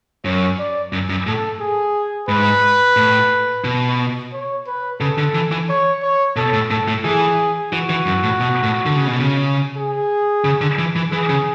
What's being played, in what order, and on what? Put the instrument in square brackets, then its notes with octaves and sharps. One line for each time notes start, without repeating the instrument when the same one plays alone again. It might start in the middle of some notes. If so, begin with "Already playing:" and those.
[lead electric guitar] F#2 [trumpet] C#5
[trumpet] D5
[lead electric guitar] F#2
F#2
[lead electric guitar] A2 [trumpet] A4
[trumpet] G#4
[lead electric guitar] G#2 [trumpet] B4
[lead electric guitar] A2
B2
[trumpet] C#5
B4
[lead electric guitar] C#3 [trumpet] A4
[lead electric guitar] D3
E3
E3
[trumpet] C#5
C#5
[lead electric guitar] B2 [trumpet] A4
[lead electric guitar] A2
[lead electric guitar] A2 [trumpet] A4
[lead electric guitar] A2
[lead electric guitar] E3 [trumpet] G#4
[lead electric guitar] E3 [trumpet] F#4
[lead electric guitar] E3
F#2
A2
B2
A2
D3
C#3
B2
C#3
[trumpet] G#4
[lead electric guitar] C#3
D3
E3
E3
[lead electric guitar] E3 [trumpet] G#4
[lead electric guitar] C#3